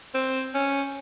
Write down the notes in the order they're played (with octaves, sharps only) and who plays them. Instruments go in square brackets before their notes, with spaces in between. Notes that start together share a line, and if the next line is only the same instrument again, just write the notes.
[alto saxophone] C4
C#4